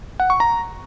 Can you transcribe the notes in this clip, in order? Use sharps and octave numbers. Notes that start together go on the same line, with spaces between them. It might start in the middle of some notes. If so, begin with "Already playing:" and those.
F#5
C#6
A#5